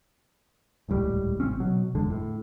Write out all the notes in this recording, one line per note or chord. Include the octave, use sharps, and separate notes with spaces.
D#1 C#2 A2 G3
G#1 C#3 C4 C#4
B2 F#3
F#1 E2 D3 G#3
A2